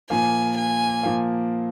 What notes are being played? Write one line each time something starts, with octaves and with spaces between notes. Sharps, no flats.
A#2 F3 A#3 G#5
G#5
A#2 F3 A#3